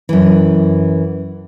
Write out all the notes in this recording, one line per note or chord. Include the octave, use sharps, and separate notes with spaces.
F#2 E3